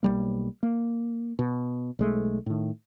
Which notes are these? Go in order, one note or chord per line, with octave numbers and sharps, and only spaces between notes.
B1 F2 G3 A#3
A#3
B2
B1 G#3 A3
A2 D#3